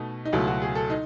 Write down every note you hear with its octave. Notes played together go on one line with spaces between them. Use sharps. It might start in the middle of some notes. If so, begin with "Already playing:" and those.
Already playing: B2 A3 D#4
D#4
C#2 B2 F#3 A3 E4
F#4
G#4
A4
D#4